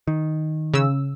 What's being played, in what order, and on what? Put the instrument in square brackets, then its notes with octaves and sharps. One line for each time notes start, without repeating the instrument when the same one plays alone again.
[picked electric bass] D#3
[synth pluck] C#3 E6